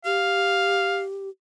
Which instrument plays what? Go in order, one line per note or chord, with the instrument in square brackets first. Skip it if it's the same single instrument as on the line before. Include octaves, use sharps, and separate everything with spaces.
[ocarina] G4 [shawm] F5